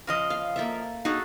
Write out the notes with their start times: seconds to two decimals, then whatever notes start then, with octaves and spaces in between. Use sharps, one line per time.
0.07 C#3 F3 D#5
0.30 F5
0.56 A#3 A4 E5
1.05 D#4 F#4 G#4 A4